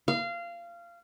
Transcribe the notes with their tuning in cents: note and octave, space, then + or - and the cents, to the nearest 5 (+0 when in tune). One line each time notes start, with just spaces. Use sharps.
F5 -20